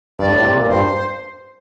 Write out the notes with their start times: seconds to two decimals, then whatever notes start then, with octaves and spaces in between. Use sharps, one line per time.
0.19 G2 D5
0.32 A2
0.44 C3
0.57 A#2
0.63 A#4
0.69 G2 C5